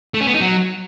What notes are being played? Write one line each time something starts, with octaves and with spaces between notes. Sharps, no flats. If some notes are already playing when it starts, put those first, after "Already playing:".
A3
C#4
B3
D#4
F#3